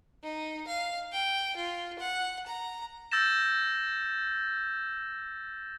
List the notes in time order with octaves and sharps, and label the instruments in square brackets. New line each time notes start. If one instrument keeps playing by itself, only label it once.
[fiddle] D#4
F5
G5
F4
F#5
A#5
[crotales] E6 G6 A6 A#6 E7